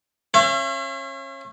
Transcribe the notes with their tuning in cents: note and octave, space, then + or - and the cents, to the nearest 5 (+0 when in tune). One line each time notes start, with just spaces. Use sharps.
C#4 -30 E5 +45